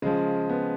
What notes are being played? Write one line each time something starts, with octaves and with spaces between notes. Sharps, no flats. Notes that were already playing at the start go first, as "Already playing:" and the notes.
C#3 F3 G#3
B3